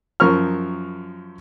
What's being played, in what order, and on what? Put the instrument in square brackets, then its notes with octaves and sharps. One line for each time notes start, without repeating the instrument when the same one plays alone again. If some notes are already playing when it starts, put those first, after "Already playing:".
[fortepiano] F#2 F3 A#4 C#6 F6